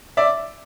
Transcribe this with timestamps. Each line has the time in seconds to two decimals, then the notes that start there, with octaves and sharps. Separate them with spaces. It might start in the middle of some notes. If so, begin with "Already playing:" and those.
0.17 D5 E5